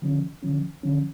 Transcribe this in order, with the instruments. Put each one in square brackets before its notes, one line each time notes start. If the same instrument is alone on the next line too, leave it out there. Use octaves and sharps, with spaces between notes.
[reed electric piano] D3 F3 C#4
D3 F3 C#4
D3 F3 C#4